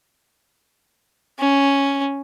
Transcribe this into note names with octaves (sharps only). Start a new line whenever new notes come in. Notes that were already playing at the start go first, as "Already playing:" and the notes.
C#4